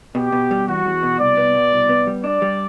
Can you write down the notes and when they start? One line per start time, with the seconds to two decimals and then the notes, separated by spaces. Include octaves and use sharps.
0.15 B2 G4
0.32 B2
0.51 G3
0.68 E2 F#4
0.85 E2
1.03 B2
1.20 C2 D5
1.37 B3
1.55 B2
1.72 C2
1.89 B3
2.07 G3
2.24 D4 D5
2.42 G3